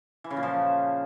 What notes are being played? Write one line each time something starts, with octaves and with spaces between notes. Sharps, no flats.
E3
C#3
A#2
F3